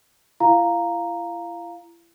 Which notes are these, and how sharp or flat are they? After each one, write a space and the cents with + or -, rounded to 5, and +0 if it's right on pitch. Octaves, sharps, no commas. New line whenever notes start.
E4 +40 F5 +0 A#5 +0